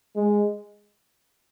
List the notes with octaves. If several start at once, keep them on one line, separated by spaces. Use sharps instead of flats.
G#3